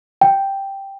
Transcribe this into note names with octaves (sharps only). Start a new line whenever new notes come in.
G5